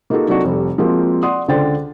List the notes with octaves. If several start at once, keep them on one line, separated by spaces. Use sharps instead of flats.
A#3 D#4 F4 F#4 G#4 A4
C3 F#3 D4 D#4 F#4 A4
F1 G3
F3 G#3 A#3 C4 F#4
D5 F#5 C6 D#6
C#2 D3 D4 C5 G5 A6